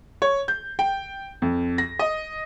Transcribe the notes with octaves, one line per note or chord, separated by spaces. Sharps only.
C#5
G6
G5
F2
A#6
D#5